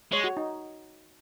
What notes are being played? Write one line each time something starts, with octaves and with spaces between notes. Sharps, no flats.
G#3 C#5
F#4
D#4